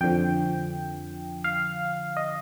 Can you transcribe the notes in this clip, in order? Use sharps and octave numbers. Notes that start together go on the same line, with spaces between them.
F2 D3 F3 G5
F5
D#5